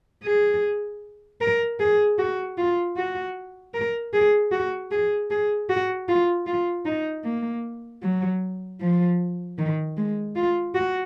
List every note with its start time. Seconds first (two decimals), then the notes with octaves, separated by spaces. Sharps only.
0.24 G#4
1.41 A#4
1.80 G#4
2.19 F#4
2.58 F4
2.97 F#4
3.74 A#4
4.13 G#4
4.52 F#4
4.92 G#4
5.31 G#4
5.69 F#4
6.08 F4
6.47 F4
6.86 D#4
7.25 A#3
8.03 F#3
8.81 F3
9.58 D#3
9.97 G#3
10.36 F4
10.75 F#4